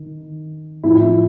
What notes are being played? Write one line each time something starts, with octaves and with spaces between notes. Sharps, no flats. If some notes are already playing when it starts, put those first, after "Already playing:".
Already playing: D#3
A2 F3 E4